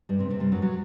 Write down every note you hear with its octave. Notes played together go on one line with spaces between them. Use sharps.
G2 G3
C3 C4
C3 C4
G2 G3
F#2 F#3
F#3